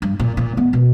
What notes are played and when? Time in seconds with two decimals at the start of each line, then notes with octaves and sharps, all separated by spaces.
0.02 G2
0.20 A#2
0.37 A#2
0.57 B3
0.73 B2